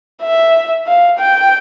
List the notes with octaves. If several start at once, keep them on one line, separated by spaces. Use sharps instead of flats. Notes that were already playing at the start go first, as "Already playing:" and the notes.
E5
F5
G5